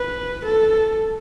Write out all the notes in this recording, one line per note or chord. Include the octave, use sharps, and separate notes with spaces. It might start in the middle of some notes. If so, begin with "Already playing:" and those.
Already playing: B4
A4